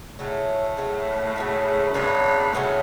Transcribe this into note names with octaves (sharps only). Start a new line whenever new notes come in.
A2 C#3 F#3 A3
C#3 F#3 A3
C#3 F#3 A3
F#2
G2 C#3 F#3 B3 E4
A2 C#3 F#3 B3 E4